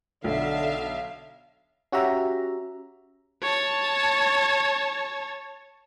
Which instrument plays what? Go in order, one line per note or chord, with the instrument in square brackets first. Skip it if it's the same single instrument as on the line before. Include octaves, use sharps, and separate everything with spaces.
[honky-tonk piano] B1 [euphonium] D3 [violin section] E5 F5
[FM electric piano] C#4 F#4 G4 E5 A#5
[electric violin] C#5 A5